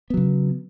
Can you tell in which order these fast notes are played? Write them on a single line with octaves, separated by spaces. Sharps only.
B3 F#3 C#3